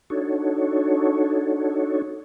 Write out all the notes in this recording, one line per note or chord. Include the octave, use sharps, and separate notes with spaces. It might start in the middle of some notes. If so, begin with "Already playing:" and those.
D4 D#4 F#4 A4 C#5